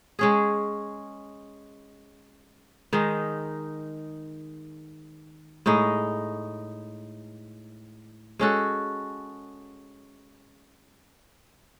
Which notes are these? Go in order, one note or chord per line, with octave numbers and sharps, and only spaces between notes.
G#3 C#4 G#4
D#3 G#3 D#4
A2 G#3 D#4
G#3 C#4 F#4 A4